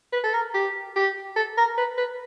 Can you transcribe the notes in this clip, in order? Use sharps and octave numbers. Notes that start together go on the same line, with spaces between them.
B4
A4
A#4
G4
G4
A4
A#4
B4
B4